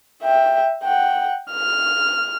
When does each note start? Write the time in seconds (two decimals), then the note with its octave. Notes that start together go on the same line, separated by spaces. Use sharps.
0.22 E5 G5
0.83 F#5 G5
1.52 F6